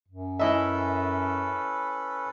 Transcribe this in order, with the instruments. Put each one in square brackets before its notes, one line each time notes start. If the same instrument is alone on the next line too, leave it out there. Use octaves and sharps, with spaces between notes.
[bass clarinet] F#2
[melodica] C#4 A4 B4 [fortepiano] E4 D#5 E5